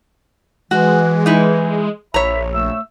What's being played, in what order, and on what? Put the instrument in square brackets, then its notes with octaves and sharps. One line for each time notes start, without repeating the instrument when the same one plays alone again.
[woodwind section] E3 [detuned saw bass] G#3 [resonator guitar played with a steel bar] F#4
[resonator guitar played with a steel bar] D#4 E4
[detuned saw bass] A#1 [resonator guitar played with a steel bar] C#5 A#5 [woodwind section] E5 B5
[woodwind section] A3 E6